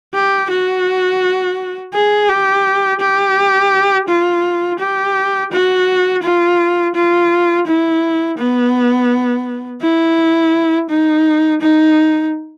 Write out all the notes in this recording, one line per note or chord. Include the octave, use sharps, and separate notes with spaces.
G4
F#4
G#4
G4
G4
F4
G4
F#4
F4
F4
E4
B3
E4
D#4
D#4